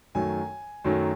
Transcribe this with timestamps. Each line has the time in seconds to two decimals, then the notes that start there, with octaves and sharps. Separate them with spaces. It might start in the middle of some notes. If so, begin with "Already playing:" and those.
0.15 F#2 D#3 F#3 A3 G#5
0.85 F#2 D#3 F#3 A3